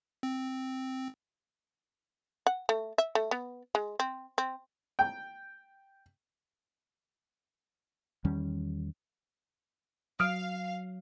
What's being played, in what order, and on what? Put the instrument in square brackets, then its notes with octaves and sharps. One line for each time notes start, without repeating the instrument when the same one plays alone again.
[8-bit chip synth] C4
[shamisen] F#5
A3
E5
A3
B3
G#3
C4
C4
[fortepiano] G5
[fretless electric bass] E2 D#3 G3 C#4
[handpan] F#3 [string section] F5 [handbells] D#6 F6 D7